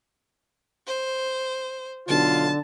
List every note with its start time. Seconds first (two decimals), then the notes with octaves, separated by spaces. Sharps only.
0.87 C5
2.08 B1 D3 F4 A5